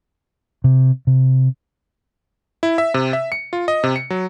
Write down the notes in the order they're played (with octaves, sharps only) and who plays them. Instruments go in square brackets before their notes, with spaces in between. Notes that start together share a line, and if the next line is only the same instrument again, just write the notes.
[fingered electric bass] C3
C3
[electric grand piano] E4
E5
C3
E5
C#7
F4
D#5
C3
C#7
F#3